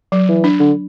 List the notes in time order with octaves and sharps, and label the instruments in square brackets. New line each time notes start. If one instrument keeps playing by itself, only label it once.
[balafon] F#3
[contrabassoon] E3
[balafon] D4
[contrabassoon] D3